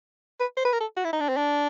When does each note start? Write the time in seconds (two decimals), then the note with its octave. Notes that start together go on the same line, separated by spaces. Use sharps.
0.40 B4
0.57 C5
0.65 B4
0.73 A#4
0.80 A4
0.97 F#4
1.05 E4
1.13 D#4
1.20 D4
1.29 C4
1.37 D4